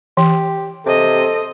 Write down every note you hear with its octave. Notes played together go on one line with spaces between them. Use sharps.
E3 G4
C3 A4 C5 D#5